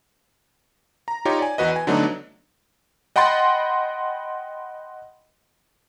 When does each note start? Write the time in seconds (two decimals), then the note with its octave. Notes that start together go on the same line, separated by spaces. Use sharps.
1.08 A#5
1.25 D#4 F4 G4 C#5
1.39 D5 G#5
1.58 E2 F#4 B4 D#5
1.76 G#5
1.87 D3 F#3 A3 B3 D4 D#4
3.16 D#5 F#5 G5 B5 C6 A6